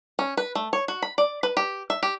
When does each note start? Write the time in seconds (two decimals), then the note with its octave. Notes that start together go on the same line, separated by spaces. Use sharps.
0.19 C#4
0.37 B4
0.55 A3
0.73 C#5
0.88 F#4
1.02 B5
1.18 D5
1.43 B4
1.57 G4
1.90 E5
2.03 G4